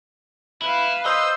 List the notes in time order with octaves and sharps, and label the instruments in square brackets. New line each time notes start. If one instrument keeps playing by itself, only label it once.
[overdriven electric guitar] E4 [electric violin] B4 F5
[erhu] C5 [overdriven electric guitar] D#5 [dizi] E6